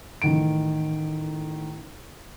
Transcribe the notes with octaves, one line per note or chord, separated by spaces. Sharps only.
A1 D#3 D7